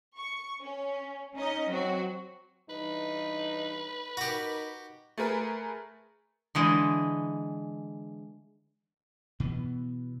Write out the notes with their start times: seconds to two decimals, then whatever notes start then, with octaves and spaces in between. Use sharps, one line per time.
0.17 C#6
0.62 C#4
1.35 C#4 D#4 D#5
1.69 F#3 C4 F#4
2.70 G2 E3 D#4 B4
4.17 D#4 F#4 G4 A#4
5.18 A3 G#4 A#4 B4
6.55 D3 E3 G#3
9.40 B2 E3 B3